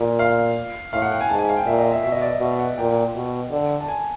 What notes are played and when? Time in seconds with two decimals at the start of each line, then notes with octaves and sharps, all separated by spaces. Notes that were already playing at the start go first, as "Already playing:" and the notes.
Already playing: A#2
0.19 F5
0.93 A2 F5
1.02 F#5
1.11 G5
1.21 G#5
1.29 G#2 A5
1.39 G#5
1.49 F5
1.57 G5
1.66 A#2 E5
1.78 D#5
1.92 E5
2.03 B2 E5
2.12 D#5
2.22 D5
2.31 D#5
2.40 B2 E5
2.59 F#5
2.78 A#2 G5
3.15 B2
3.51 D3
3.80 A5
3.88 G#5